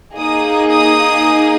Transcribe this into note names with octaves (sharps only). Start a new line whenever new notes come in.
A#3 D#4 G#4 D#6
D#6